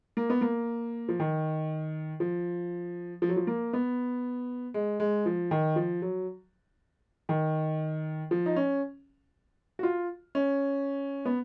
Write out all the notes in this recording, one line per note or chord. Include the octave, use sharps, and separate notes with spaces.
A#3
B3
A#3
F3
D#3
F3
F3
F#3
F3
A#3
B3
G#3
G#3
F3
D#3
F3
F#3
D#3
F3
D#4
C#4
F#4
F4
C#4
B3